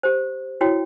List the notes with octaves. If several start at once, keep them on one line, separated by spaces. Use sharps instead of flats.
G4 C5
E4 F#4 C#5 G5